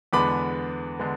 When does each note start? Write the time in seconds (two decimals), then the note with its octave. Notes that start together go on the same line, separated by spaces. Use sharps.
0.13 E2 D3 G#3 B3 B5 D6
0.99 D3 G#3 B3